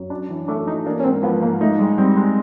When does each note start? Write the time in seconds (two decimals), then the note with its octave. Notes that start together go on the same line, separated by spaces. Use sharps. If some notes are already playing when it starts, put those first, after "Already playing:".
Already playing: F#2
0.10 D4
0.29 E3
0.48 A3 D4
0.67 E3 D#4
0.86 A#3 D4
1.00 C#4
1.04 G#2 C4
1.23 F3 B3
1.42 G#2 A#3
1.61 A3 D#4
1.79 G3 G#3
1.98 G3 C4
2.17 G#3